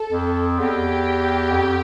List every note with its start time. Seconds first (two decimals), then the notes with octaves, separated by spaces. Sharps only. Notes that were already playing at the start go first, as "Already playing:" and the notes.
Already playing: A4
0.11 F2
0.59 E2 G4
1.52 F2